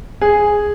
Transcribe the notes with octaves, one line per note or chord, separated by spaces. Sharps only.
G#4